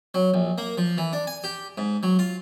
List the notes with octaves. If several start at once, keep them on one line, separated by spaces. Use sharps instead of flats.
F#3
A#1
A#3
F3
E3
D4
G#5
G4
G#2
F#3
F4